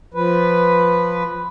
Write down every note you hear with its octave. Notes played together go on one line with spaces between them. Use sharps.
F3 B4